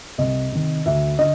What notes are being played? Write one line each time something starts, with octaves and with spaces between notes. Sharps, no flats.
C2 D#5
C3 D#3
D2 E5
D3 D#5